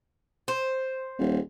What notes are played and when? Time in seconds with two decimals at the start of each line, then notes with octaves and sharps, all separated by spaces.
0.48 C5
1.18 D#1